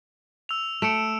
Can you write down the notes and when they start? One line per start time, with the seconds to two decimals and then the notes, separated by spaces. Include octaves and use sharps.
0.49 E6 F7
0.82 A3 C#7 D7 E7